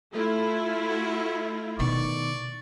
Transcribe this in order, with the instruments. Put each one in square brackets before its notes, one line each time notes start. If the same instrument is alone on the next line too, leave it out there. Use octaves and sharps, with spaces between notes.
[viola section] A3 E4 F4
[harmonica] F#4
[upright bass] B2 D#3 [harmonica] D5 C#6